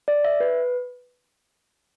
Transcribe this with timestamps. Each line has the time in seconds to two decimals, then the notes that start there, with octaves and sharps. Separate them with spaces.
0.08 D5
0.24 E5
0.40 B4